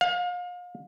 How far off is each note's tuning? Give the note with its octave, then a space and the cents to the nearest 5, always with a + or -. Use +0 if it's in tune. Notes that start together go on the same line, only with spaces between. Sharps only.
F5 +35